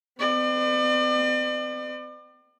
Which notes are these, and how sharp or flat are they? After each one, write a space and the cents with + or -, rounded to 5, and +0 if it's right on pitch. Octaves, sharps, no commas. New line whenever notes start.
C4 -40 D5 +40